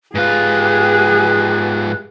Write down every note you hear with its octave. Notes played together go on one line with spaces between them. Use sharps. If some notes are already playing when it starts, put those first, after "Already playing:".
G#2 F4 G4 G#4 B4